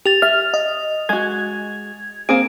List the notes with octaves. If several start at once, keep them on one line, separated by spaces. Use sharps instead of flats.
G4 A6 F7
E5 F6
D#5
G#3 F#4 G#6
A#3 C4 G#4 D7